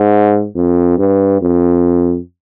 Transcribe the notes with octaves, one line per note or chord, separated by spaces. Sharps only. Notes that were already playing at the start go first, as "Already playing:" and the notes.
Already playing: G#2
F2
G2
F2